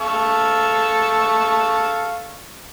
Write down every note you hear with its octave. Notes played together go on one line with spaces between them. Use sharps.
A4 F5 C#6